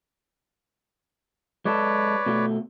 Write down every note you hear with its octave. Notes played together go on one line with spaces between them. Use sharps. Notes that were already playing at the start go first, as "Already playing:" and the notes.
G#3 A4 B4 C#5 D5
B2 A3